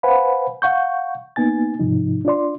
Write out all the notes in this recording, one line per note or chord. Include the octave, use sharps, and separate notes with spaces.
B4 C5 F5 F#5 G#5 B5
F5 F#5 C#6 G6
A#3 B3 D#4 G#5 A6
G#2 C3 F3 D#4
D4 F4 D5 C6